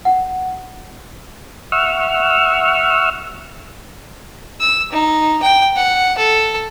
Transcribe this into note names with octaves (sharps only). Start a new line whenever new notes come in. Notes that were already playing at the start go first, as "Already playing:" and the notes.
F#5
E5 F#5 C#6 E6 F6
E6
D#4
G5
F#5
A4